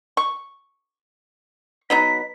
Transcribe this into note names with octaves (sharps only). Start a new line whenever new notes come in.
C#6
F#3 B3 D#4 B6